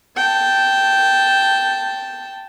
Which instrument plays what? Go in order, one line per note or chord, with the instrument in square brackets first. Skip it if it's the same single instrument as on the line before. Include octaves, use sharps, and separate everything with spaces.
[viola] G5 A5